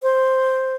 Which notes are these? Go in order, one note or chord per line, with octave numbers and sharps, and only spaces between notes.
C5